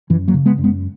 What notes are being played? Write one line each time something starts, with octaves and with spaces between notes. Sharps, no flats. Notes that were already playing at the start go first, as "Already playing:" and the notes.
F#2 E3
F#3 A#3
C#3
G#3 B3
F#2
G#3 B3